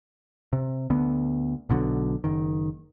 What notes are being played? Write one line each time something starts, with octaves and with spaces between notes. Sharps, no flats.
C3
D2 D3 B3
B1 B2 D3 F#3
F#1 D#3